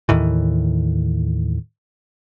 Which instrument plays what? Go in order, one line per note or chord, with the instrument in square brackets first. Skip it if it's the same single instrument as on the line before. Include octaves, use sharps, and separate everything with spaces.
[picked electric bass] D#2 A2 D#3 E3